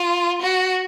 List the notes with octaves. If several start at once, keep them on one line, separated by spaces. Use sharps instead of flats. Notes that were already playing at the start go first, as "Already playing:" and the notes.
Already playing: F4
F#4